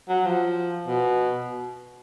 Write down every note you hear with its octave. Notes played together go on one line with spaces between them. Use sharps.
F#3
F3
B2